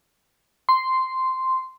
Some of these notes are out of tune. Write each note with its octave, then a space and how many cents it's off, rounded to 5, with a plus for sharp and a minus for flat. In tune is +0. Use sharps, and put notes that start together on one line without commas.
C6 -5